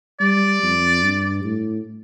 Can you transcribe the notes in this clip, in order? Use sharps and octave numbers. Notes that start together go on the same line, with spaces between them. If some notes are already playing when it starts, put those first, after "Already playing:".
G3 D5
F2
G2
A2